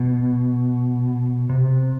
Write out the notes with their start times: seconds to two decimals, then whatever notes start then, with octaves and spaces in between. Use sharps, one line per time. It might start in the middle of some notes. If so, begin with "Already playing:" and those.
Already playing: B2
1.49 C3